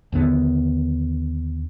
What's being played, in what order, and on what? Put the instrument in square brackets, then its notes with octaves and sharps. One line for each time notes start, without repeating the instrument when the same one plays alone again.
[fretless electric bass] D#2 D3 F#3 B3